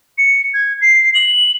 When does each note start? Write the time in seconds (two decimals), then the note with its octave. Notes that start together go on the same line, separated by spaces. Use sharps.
0.18 C#7
0.54 G#6
0.81 C7
1.14 F#7